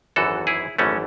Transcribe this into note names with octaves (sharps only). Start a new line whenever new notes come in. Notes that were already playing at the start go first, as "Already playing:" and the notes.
G#1 F#2 E3 F#4 A4
E4 G#4
G#1 F#2 E3 A3 C#4